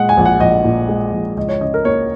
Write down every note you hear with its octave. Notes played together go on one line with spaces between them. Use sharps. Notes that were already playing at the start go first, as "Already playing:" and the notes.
Already playing: A#2 G#3 F#5
G#5
A#1
F#5
A#1 D#5
A#2
G#3
A#1
C#2 D#5
C#5
C#3 D#5
A#4
A#3 C#5